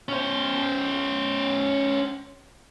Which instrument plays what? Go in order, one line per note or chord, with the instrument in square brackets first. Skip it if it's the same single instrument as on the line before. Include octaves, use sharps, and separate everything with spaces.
[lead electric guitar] C#4 C5